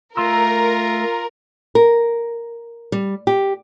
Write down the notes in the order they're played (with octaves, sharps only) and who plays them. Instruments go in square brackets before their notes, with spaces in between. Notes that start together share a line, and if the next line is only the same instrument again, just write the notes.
[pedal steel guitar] A3 C6 E6 [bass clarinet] F4 [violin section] A#4 [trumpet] A#5
[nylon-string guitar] A#4
G3
G4